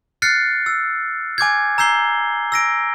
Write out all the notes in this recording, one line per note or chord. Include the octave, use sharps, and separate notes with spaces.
F6 F#6 A6 C7 C#7
E6
G#5 D6 G6 G#6
A#5 E6 G6 C7 G7
E6 A#6 D7